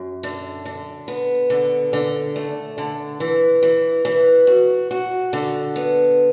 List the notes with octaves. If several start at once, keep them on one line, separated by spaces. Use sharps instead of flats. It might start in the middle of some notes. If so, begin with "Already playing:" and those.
Already playing: F#2
D3
D3
B3
D3
D3
A3
D3
E3
E3
E3
F#4
F#4
D3
B3